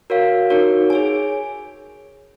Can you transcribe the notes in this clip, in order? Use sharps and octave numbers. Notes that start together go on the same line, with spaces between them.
F#4 A#4 C#5 F5
D#4 F#4 A#4 C#5
G#4 C#5 G#5